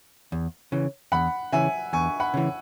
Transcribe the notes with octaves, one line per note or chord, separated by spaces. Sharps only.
E2
C#3 E3
E2 F#5 B5
C#3 E3 E5 G#5
E2 G#5 C#6
F#5 B5
C#3 E3